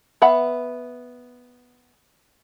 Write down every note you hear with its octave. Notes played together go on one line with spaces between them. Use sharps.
B3 E5 F#5 B5